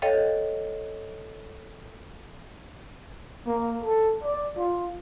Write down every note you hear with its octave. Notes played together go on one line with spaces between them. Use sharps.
A4 C#5 D#5 F5 G5
A#3
A4
D5
F4